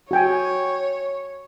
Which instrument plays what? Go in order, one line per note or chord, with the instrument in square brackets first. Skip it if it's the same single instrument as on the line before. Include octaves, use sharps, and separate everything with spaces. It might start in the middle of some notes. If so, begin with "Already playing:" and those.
[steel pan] F#4 G5 G#5 [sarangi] C#5